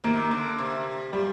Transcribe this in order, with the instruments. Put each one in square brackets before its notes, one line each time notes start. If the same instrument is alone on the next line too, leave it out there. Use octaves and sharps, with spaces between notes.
[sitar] C3 D#3 [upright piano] A#3
[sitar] D3
C3
[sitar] A#2 [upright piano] G3